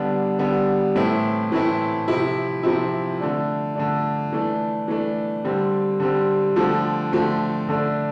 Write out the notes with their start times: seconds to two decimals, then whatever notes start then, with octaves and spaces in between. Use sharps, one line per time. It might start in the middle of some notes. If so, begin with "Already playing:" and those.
Already playing: D3 G3 B3 D4
0.39 D3 G3 B3 D4
0.95 A2 E3 A3 C4 E4
1.52 A2 E3 A3 C4 E4
2.08 C3 F3 C4 E4
2.63 C3 F3 C4 E4
3.20 D3 A3 D4
3.75 D3 A3 D4
4.32 E3 A3 D4
4.88 E3 A3 D4
5.44 D3 G3 C4
6.00 D3 G3 C4
6.56 D3 F3 A3 C4
7.12 D3 F3 A3 C4
7.69 D3 A3 D4